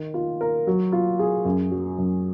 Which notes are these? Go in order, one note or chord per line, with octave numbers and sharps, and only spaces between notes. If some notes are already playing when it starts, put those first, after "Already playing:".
Already playing: D#3
F4
A#4
F#3
F4
G#4
F#2
F#3
F#2